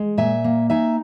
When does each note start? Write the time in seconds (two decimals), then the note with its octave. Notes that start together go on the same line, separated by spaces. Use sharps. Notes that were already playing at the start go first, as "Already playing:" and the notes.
Already playing: G#3
0.17 A#2 E5 G#5
0.44 A#3
0.70 D#4 E5 G#5